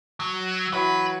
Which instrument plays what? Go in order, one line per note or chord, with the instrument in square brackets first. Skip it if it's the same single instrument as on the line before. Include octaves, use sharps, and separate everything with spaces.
[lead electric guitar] F#3
[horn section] E3 F#3 [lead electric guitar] B4